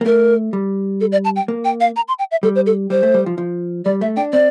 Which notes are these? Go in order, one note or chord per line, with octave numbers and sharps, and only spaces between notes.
A#3
A3 A#4
G3
A4
D5
A5
G5
A#3
G5
F5
A#5
C6
G5
E5
G3 A4
C5
A4
G3 C5
A3
G3
F3
F3
G3 D5
A3 E5
D4 G5
C4 D5